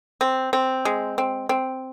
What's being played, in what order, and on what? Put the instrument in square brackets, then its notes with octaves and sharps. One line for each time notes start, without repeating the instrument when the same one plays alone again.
[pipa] C4
C4
G#3
C4
C4